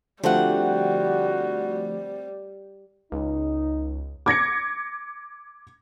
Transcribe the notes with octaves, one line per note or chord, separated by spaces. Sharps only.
D3 F3 G3 A3 C4 F#4 G4 F#5
C#2 D#4
D6 G#6 A#6 C#7